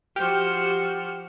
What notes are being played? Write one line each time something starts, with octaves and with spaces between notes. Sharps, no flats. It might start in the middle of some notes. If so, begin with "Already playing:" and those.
F3 F#4 G4 C5 G5 F6